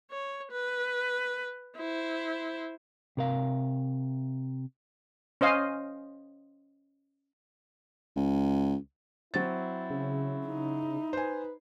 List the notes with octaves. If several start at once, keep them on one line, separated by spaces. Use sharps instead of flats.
C#5
B4
E4 C5
C3 A#4 F5
C#4 C5 D#5 F5
C#2
F#3 C4 E4 A6
C#3
D#4
B4 C5 G#5